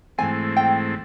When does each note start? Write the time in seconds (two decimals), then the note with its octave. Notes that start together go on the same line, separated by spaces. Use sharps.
0.18 G#2 E3 A3 C4 G#5
0.56 G5